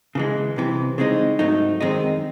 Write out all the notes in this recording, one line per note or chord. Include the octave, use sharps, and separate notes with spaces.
C#3 E3 G#3
C2 C3 E3
C#3 G#3 C4 D#4
G#2 F#3 A3 D#4
F#2 D#3 G#3 C4 D#4